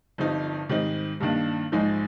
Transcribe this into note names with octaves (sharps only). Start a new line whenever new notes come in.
G1 G2 F3 C4 D#4
G#2 D#3 G3 C4 D#4
G2 D#3 A#3 D4
A#1 G#2 F3 G#3 D#4